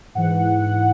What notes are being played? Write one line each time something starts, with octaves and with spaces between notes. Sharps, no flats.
G#2 E3 F#5